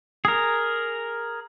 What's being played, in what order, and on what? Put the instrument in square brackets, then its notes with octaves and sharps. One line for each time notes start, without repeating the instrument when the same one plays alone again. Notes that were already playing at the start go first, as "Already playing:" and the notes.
[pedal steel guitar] G#4 A#4